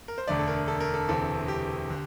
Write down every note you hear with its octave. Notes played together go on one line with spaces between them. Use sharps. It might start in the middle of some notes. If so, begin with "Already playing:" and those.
A#4
C5
E1 D2 D3 A3 D5
A4
A#4
A4
A#4
A4
E1 D2 C3 E3 A4
G4
D3